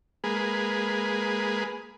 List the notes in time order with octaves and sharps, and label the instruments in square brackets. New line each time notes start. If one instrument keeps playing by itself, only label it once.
[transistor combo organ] G#3 A#3 G#4 B4